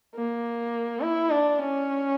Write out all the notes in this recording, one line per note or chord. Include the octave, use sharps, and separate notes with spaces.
A#3
E4
D4
C#4